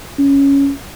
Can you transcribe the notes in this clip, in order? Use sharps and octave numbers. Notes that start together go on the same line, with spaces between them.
C#4